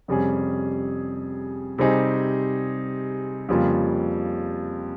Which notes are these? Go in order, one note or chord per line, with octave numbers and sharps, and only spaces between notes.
F2 C3 G3 C#4 G#4
C3 G3 C4 D#4 G#4
F2 C#3 G3 A#3 F4